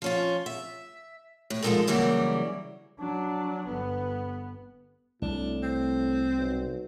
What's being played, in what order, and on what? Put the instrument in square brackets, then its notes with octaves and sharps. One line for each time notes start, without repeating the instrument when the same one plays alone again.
[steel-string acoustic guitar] F3 C#4 F4
E5
A2
F3 G#3 A#3 D#4 A4 A#4
C#3 E3 F#3 G3 A#3
[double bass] F#3 D4
G1 B3
[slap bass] C2 [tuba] A2 [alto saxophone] D4
[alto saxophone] C4
[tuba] B1